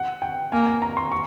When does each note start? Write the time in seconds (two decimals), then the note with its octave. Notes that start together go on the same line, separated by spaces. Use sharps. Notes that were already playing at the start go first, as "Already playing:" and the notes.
Already playing: F#5
0.22 G5
0.52 A#3 G#5
0.67 G#5
0.82 A#5
0.97 C6
1.12 C#6